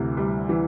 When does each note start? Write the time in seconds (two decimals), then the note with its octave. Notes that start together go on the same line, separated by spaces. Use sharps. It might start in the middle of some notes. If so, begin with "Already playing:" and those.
Already playing: D2 C3 E3
0.17 G3
0.49 E3